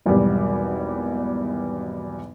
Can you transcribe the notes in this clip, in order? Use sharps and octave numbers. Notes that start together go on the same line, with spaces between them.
G#1 E2 B2 F#3 G3